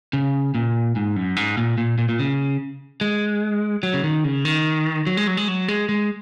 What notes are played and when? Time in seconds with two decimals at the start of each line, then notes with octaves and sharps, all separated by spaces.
0.13 C#3
0.55 A#2
0.96 G#2
1.16 F#2
1.36 G#2
1.58 A#2
1.78 A#2
1.98 A#2
2.09 A#2
2.19 C#3
3.01 G#3
3.83 F#3
3.94 C#3
4.04 D#3
4.24 C#3
4.45 D#3
5.07 F#3
5.17 G#3
5.27 F#3
5.37 G#3
5.48 F#3
5.68 G#3
5.89 G#3